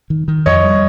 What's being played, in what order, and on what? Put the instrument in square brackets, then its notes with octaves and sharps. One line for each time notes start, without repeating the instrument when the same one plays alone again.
[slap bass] D#3
D#3
[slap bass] F2 [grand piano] C#5 D#5
[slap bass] G3